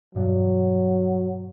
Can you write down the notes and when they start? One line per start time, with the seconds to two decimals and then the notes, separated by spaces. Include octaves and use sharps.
0.15 E2 G2 B2 F#3